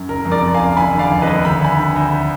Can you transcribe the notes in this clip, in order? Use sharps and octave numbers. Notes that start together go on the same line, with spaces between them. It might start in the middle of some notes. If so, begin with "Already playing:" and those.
Already playing: F#2
F#1 A#4
F2
A#4 D5
F2
F5 G#5
F#1
D#2 G#5 B5
D3
D5 F5
F1
B4 D#5
D#2
D2 B5
D2 G#5 B5
D3
D2